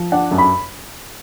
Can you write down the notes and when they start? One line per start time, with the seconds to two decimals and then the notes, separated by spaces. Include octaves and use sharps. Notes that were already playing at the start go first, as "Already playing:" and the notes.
Already playing: F3
0.12 D4 F#5
0.31 F#2
0.38 B5